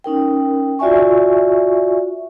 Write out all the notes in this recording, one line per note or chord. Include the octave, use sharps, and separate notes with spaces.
C#4 D#4 A#4 G5
F4 F#4 D5 E5 G#5 C#6